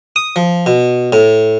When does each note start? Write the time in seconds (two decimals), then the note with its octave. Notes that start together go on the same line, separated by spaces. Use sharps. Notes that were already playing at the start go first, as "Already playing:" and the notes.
0.16 D#6
0.36 F3
0.66 B2
1.13 A2